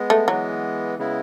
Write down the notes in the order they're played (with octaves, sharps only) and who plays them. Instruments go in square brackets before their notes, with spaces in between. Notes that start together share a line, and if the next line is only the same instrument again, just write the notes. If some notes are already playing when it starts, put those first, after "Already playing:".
Already playing: [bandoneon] G#3 B3
[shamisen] A3
[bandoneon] E3 G#3 B3 [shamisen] F#3
[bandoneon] C#3 G#3 B3 E4